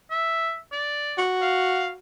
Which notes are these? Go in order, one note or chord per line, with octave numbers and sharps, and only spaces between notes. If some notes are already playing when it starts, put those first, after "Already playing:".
E5
D5
F#4
F5